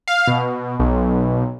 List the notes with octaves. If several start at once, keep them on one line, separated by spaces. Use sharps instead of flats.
F5
B2
B1